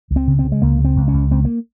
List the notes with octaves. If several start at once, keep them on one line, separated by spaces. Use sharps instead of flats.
C#2
C4
C#3
C4
C#3
G#3
C#2 A#3
C#3
C4
C#2
C#4
C#2
C#2 C4
A#3